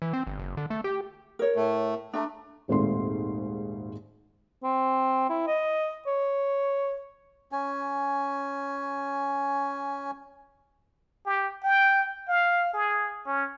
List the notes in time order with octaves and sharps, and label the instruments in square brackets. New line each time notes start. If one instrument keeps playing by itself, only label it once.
[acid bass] E3
C4
G1
F#1
D3
A3
G4
[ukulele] A#4 C#5
[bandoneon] A2 A3
[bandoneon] A3 [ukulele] D4 A#5
[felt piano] D#1 G#1 G#2 A3 C6
[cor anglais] C4
E4
D#5
C#5
[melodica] C#4 G#5
[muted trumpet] G4
G5
F5
G#4
C#4